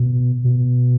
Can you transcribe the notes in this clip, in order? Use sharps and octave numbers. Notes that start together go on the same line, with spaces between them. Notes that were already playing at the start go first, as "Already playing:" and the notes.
Already playing: B2
B2